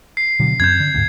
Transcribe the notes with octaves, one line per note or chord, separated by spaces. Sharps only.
C7
B2 D3 F#3
F#2 C4 G6 G#6
D3
D2 G#2